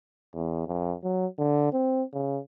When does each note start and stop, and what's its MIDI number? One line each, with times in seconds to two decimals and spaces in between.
0.35 0.64 40
0.66 0.95 41
1.03 1.26 54
1.38 1.71 50
1.72 2.03 60
2.13 2.39 49